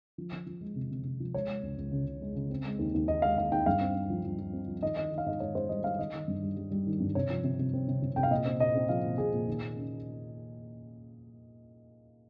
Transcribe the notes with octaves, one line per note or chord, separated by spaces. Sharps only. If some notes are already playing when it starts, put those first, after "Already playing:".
F3
F3
F3
G#3
C3
C3
C3
F3
G#3 C#5
G#3
C#2
C#2
C#3
C#3
G#3
C#3
C4
G#3
D#2
D#2
D#2 D#5
G#3 F5
D#2 F5
D#2 G5
G2 F5
C4
C4
F3
F3
F3
C4
F3
D#3 D#5
D#3 D#5
D#3
F5
G#2 D#5
G#2 C#5
G#2 C5
G3 D#5
D#3 F5
D#3 D#5
D#3
G2
G3
G3
G3
D#3
G2
C3 C#5
F3
C3
C3
C4
C3
C3
C3 G5
F5
A#2 D#5
C4
A#2 D#5
C4
F3 F5
A#2
A#2 G#4
A#2
D#3
A#3
C#4